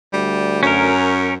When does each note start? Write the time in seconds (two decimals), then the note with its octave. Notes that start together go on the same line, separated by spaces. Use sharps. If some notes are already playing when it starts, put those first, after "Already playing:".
0.13 D2 G3
0.63 F#2 C#4 A#4